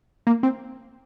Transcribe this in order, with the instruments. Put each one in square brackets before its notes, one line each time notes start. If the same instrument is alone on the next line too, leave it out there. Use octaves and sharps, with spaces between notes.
[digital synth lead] A#3
C4